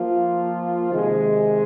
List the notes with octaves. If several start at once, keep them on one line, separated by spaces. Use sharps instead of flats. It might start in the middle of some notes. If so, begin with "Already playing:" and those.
Already playing: F3 A#3 F4
C3 D#3 G#3